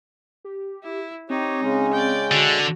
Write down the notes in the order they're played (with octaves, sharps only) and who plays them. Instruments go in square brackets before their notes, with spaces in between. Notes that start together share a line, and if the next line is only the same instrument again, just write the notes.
[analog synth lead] G4
[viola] E4
[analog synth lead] C4 [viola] D#4 [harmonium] G4 C#5
[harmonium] C#3 G#3 C#4
[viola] D5 G5
[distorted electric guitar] D3 [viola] F#4 [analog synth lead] F#5